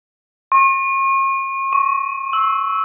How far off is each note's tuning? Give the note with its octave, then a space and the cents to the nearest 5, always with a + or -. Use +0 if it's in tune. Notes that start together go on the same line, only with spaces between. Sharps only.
C#6 -45
C#6 +10
E6 -10